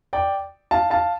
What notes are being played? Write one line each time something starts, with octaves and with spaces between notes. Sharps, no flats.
D5 G5
F5 A5
F5 A5